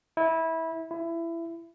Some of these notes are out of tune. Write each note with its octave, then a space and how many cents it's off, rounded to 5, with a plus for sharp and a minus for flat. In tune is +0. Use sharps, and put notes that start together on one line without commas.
E4 -20
E4 +20